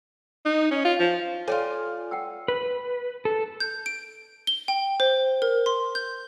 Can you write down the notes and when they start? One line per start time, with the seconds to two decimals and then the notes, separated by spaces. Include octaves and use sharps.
0.46 D#4
0.71 C#4
0.85 F4
1.00 F3
1.48 F4 A4 C#5 D5 G5 G#5
2.11 F#5 G5 E6
2.48 B4
3.25 A4
3.60 G6
3.86 D7
4.47 G7
4.68 G5
5.00 C5
5.42 A#4
5.66 C6
5.95 G6